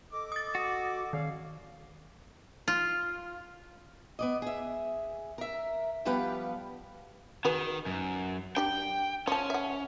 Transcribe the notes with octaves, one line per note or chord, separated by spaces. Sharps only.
A4 D#5 D6
D#6 A6
F#4
D#3 C#5 F5
F4
B3 D5 D#5
G#4 E5
A#4 E5
F3 G3 B3 G4 B4 F5
D#3 F#4 G#4 B4
F#2
D4 G4 G5
F3 C#4 A5
E5 F#5